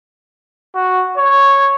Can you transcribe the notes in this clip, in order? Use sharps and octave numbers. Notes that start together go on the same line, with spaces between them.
F#4
C#5